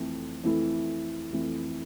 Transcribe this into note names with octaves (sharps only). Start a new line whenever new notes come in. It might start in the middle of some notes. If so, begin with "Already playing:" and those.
Already playing: F2 E3 A3 E4
F2 E3 A3 E4
F2 E3 A3 E4